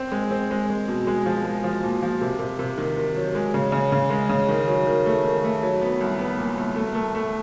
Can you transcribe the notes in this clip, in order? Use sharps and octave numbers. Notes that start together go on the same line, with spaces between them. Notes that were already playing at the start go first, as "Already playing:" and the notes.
Already playing: C4
G#3
C4
G#3
G#3
B2
G#3
F3
G#3
F3
A#2
F3
C3
C3
C3
D#3
D#3
F#3
G#3
C#3
C#3
C#3
G#3
C#3
D#3
F#3
D#3
A3
D#3
A3
F#3
B3
C2
B3
A#2
C2
A3
A3
A3